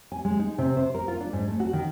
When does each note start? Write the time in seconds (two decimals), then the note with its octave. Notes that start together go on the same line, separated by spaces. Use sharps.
0.12 G#5
0.25 G#3
0.39 D#4
0.58 C3
0.77 C5
0.95 A#4
1.08 F4
1.20 D4
1.33 G#2
1.48 A3
1.60 F#4
1.73 D#3